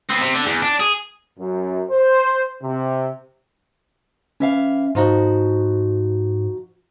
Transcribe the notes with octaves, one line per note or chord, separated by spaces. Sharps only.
B3 C4
C3
D3
E2
D4
G#4
F#2
C5
C3
E3 C#4 E5 F5
G#2 F3 D#4 F#4